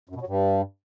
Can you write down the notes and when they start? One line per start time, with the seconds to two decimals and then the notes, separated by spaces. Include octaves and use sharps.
0.09 F#2
0.15 B2
0.21 F#3
0.27 G2